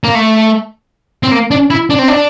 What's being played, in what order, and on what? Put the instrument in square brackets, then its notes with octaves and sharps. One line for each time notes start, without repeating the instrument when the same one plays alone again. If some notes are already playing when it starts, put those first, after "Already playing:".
[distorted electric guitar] A#3
A3
C4
A#3
D4
E4
D4
C4
D4